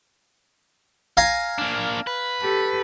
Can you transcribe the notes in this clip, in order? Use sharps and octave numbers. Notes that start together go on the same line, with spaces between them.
F5 G#5 A#5
A#3 D4
B4
G4 A4